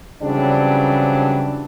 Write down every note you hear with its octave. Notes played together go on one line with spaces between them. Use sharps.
C#3 E3 F#3 G3 C4 D4